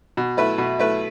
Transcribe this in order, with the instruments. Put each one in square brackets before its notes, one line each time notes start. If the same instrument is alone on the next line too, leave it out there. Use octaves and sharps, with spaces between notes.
[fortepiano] B2
A3 E4 B4
B2
A3 E4 B4